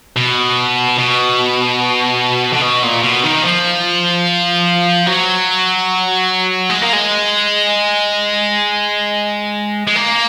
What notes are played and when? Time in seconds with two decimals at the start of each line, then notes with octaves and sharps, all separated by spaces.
0.16 B2
0.99 B2
2.53 D3
2.62 B2
2.83 A#2
3.02 B2
3.23 D#3
3.43 F3
5.07 F#3
6.70 G#3
6.82 A#3
6.93 G#3
9.87 G#3
9.96 A#3